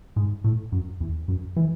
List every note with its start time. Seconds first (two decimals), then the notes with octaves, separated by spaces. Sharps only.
0.16 G#2
0.44 A2
0.72 F#2
1.01 E2
1.28 F#2
1.56 E3